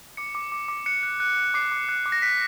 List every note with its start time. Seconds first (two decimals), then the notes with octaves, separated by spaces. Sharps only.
0.17 D6 C#7
0.35 D6
0.52 D6
0.68 D6
0.86 F#6 C#7
1.03 F#6
1.20 F#6
1.37 F#6
1.54 D6 C7
1.72 D6
1.89 F#6
2.06 D6
2.12 A#6
2.22 F#6 B6